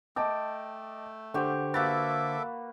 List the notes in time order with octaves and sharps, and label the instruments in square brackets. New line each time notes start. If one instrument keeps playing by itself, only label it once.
[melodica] A3 [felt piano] D#5 A5 D6 [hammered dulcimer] G5
[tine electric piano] D3 C5 [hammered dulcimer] G4 C#6 [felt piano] F#5
[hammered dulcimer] A#3 F#4 B4 [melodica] A4 E5 D6 [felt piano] A6